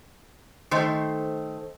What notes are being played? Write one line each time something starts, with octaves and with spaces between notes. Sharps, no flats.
D#3 A3 C5